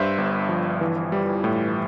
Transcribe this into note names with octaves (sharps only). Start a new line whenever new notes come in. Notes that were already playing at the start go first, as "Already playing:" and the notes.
Already playing: G2 C5 E5
G1
F3
E3
G3
A2